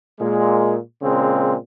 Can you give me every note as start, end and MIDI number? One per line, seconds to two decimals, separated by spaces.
0.20 0.75 46
0.20 0.75 56
1.01 1.54 46
1.01 1.54 49
1.01 1.54 56
1.01 1.54 60